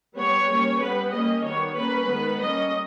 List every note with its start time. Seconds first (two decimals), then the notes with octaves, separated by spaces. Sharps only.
0.16 G3 B3 C#5
0.47 G3 A#3 C#4
0.80 G3 B3 B4
1.11 G3 A#3 C#4 D#5
1.43 D#3 G3 B3 C#5
1.75 G3 A#3 C#4 B4
2.08 D#3 G#3 B3
2.40 G3 A#3 C#4 D#5